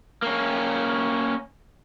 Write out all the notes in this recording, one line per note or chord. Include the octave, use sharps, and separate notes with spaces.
A#3 C#4